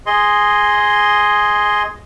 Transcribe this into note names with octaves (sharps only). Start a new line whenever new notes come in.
G#4 D#5 C6